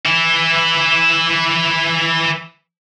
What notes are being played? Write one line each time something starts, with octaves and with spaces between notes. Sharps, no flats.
E3 E4